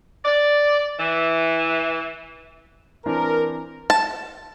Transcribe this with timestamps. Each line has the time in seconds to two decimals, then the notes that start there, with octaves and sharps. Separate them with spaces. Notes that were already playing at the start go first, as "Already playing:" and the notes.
0.25 D5
0.98 E3
3.06 E3 C4 D4 A#4
3.90 A5